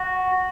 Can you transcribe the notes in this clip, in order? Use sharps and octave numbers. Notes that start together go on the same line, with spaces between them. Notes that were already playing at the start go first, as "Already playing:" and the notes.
Already playing: F#4